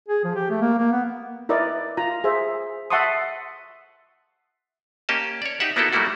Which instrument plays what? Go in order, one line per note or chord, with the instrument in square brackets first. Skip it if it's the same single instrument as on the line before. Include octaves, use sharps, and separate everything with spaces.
[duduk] G#4
F3
G4
A3
A#3
A#3
B3
[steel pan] E4 A#4 B4 D5 D#5
F4 A#5
G#4 C5 E5
E5 F#5 A5 C6 C#6 D#6
[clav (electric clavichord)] A#3 C#4 G4 D#5 A5
C#5 D5
D#4 G4 D5 E5 F#5
A#3 B3 D#4 E4 F#4 A4
F#3 G3 A3 A#3 E4 F#4